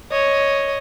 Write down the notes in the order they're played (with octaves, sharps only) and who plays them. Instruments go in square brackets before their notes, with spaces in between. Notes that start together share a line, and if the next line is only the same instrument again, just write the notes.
[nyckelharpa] C#5 D#5